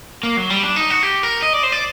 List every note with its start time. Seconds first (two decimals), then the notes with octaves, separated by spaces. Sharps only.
0.23 A#3
0.37 F#3
0.50 G3
0.63 D4
0.76 D#4
0.90 F#4
1.03 G4
1.23 A#4
1.42 D#5
1.53 D5
1.63 C5
1.72 D5